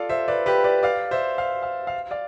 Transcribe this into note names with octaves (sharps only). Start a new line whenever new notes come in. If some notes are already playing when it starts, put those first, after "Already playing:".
Already playing: F4 A4 D5 F5
C5 E5
B4 D5
G4 B4
B4 D5
D5 F5
C5 E5
F5
F5
F5
D5 F5